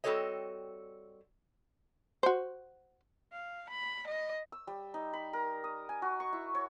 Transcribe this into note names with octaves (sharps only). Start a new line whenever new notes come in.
G3 C4 F#4 A4 C#5 D#5
F#4 C5
F5
B5
D#5
E6
G3
D#4
B5
A#4
D#6
G#5
F#4
C#6
E4
C#5